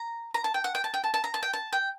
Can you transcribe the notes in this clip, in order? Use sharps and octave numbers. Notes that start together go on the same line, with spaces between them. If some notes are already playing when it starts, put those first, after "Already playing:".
Already playing: A#5
A#5
A5
G5
F#5
G5
A5
G5
A5
A5
A#5
A5
G5
A5
G5